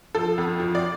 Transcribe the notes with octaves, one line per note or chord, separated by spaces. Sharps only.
F3 A4
F2
F3
D5